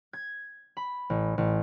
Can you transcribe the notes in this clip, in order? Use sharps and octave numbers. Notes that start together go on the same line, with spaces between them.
G#6
B5
A1
A1